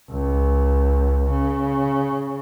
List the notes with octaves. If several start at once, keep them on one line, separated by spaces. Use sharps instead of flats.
C#2
C#3